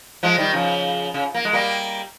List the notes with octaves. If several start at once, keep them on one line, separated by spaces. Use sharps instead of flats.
F3 G#3
D#3 G3
C#3 F3
C#3
A#3
G#3
G3 A#3